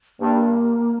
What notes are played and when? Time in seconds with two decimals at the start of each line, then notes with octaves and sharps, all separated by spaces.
0.20 G2 A#3